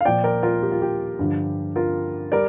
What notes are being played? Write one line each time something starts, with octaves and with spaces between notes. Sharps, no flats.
F5
A#2 F3 D5 G5
A#4 D5
F4 A#4
G4
F4
G4
G2 D3 F3
F4 A#4
G3 A#4 D5